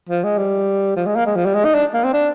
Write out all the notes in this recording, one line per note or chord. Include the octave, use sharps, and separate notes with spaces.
F3
G#3
G3
F3
G#3
A#3
G#3
F3
G3
G#3
D#4
D4
A#3
C4
D4